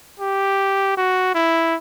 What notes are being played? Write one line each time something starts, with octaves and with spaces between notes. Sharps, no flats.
G4
F#4
E4